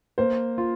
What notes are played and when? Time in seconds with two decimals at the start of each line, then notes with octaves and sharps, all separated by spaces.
0.18 A#3 C5
0.58 F4